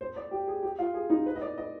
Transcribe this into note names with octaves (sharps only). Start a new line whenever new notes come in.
C5
D5
G4
G#4
G4
F4
G#4
D#4
B4
D#5
D5
D#5